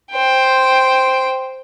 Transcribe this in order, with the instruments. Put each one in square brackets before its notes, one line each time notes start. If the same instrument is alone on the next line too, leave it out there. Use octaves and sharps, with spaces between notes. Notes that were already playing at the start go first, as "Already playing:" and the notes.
[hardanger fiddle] C5 G5